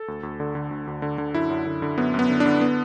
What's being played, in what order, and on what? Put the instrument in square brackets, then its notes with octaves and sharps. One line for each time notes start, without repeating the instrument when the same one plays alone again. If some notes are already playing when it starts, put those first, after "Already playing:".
Already playing: [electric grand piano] A4
D2
D2
D3
D3
D2
D2
D3
D3
F#2 E4
F#2
D3
D3
F#2 B3
F#2
B3
D3
D4
D3
B3